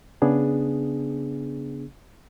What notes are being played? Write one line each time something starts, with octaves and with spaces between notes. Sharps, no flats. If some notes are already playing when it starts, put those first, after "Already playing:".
C#3 B3 D4 G#4